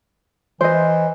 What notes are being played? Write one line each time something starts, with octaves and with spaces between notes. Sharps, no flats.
E3 C5 D#5